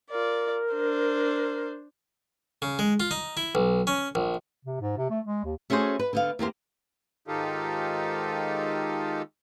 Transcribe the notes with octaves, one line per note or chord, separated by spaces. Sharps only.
F4 A#4 D5
D4 C5
C#3
G#3
F4
D#4
E4
B1
C#4
A#1
C3
G#2
C3
A3
G#3
D#2
A3 C#4 F#4 G#4 C5
B4
D3 B3 F5
E2 A#3 G4 C5
G#2 D#3 D#4 F4 G4 A4